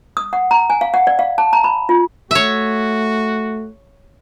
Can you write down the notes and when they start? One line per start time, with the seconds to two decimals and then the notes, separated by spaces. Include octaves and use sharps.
0.17 D#6
0.33 F#5
0.51 A#5
0.70 G#5
0.81 F5
0.94 F#5
1.07 D5
1.19 F5
1.38 A5
1.53 A#5
1.64 B5
1.89 F4
2.31 A3 F#4 C#5 E5